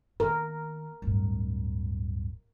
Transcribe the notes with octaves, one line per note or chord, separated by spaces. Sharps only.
D#3 B3 A#4
D1 G2